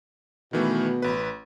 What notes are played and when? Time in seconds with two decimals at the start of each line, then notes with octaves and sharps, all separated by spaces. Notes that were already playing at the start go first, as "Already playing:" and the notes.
0.53 B2 D#3 E3 A3
1.02 A1 B4